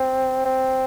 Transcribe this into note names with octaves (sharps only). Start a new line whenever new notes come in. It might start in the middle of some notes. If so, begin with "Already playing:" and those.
Already playing: C4
C4